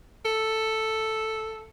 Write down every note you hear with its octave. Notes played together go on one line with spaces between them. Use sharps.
A4